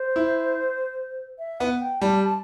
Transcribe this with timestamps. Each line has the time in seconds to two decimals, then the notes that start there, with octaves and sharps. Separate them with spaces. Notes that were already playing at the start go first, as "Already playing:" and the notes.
Already playing: C5
0.16 E4
1.39 E5
1.60 B3 F#5
1.81 G5
2.01 G3 A5
2.24 A5